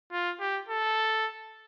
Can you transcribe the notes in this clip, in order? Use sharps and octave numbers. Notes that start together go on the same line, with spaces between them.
F4
G4
A4